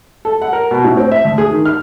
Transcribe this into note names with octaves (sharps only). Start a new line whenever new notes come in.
A4
F#5
A#4
B2
A2
C4
E5
D2
G#4
D#3
F6